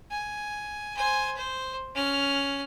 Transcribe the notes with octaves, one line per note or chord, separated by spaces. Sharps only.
G#5
C5 G#5
C5
C#4 F6